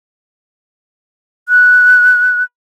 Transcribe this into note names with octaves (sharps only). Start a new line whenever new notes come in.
F#6